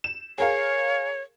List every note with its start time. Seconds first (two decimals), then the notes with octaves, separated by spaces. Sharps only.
0.04 E7
0.38 G#4 A#4 C#5 F5